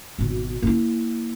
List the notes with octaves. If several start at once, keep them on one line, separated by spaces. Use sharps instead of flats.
G#1 B2
A#3 E4